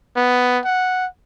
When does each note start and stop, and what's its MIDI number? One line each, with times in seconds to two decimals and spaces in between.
0.16 0.59 59
0.64 1.06 78